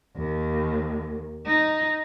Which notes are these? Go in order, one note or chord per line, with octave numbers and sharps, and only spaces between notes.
D#2
D#4